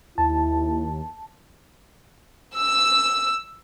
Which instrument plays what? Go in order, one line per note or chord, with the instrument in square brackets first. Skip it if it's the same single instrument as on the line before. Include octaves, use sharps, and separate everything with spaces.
[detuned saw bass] D#2 [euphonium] E4 [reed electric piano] A5
[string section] E6